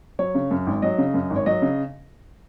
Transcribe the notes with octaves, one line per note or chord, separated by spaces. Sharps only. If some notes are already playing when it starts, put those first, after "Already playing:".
F#3 C#5
C#3
F#2
G#1
F#3 D#5
C#3
F#2
G#1
C#5
F#3 D#5
C#3